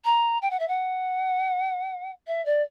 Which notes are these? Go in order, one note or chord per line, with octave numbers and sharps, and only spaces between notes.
A#5
G5
F#5
E5
F#5
E5
D5